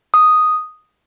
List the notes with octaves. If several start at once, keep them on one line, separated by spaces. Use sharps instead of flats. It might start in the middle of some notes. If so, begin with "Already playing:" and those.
D#6